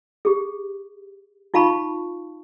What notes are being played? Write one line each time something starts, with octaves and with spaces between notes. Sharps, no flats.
G4 G#4
D#4 F4 F5 A5 B5 C#6